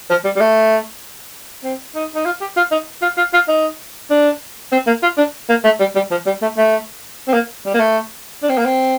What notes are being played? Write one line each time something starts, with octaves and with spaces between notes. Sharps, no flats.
F3
G3
G3
A3
C4
D#4
D#4
F4
G4
F4
D#4
F4
F4
F4
D#4
D4
C4
A#3
F4
D4
A#3
A3
G3
G3
F3
G3
A3
A3
C4
A#3
G3
A#3
A3
D4
C4
A#3
C4